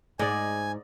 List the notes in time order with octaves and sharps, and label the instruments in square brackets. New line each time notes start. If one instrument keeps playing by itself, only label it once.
[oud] G#2 [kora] D5 D#5 [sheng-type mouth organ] G#5